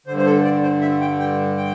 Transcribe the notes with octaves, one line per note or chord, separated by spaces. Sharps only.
G2 D3 C5
C5
A4
D5
C5
E5
G5
G5
G5